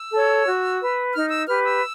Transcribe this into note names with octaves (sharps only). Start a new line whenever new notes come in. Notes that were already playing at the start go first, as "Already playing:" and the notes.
Already playing: E6
A4 C#5
F#4
B4
D#4 F6
E6
G4 B4 F6
E6